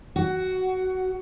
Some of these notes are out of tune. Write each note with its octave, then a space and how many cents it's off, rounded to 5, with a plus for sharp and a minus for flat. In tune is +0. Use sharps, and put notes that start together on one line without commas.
F#4 +10